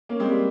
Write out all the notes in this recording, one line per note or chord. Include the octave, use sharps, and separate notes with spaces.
A#3 C#4
G#3 C4
G3 A#3